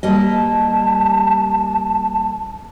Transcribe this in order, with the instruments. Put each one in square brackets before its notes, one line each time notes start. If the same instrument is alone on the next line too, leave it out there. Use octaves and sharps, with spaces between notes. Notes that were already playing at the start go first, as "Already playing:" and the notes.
[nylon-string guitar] G3 A#3 D#5 [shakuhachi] A5